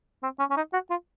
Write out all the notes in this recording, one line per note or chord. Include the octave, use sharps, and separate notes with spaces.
C4
C#4
C#4
D#4
F#4
F4